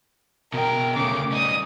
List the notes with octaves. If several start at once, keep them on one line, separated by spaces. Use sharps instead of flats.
B2 A#4 G5
C#3 A3 D6
G3 D#4 D#6